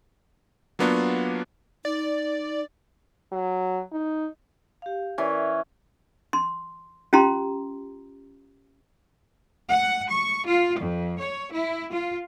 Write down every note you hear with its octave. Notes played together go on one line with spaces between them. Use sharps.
F#3 A#3 B3 D4 F4 F#4
D#4 D5
F#3
D#4
G4 F5
E3 C#4 A#4 D5
C6
C#4 F4 G4 A#5 C6
F#5
C#6
F4
F2
C#5
E4
F4